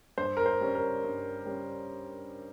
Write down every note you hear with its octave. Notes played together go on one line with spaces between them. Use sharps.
G2 C5
A#4
C5
G3 C#4
A#4
G2
G3 C#4